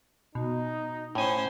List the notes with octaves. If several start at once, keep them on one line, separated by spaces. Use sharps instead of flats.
B2 D#4
A2 C#4 C5 G#5